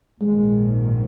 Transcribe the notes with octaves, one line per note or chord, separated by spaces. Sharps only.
A#1 G#2 D#3 G#3